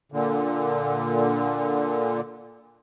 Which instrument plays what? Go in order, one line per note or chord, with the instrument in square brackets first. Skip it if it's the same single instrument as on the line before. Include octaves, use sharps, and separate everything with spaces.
[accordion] A#2 D3